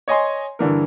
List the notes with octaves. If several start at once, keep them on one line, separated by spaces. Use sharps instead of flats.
C#5 D#5 G#5 C6
G2 D3 E3 A#4